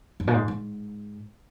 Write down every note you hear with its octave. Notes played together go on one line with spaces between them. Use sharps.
F#2
A#2
G#2
G#2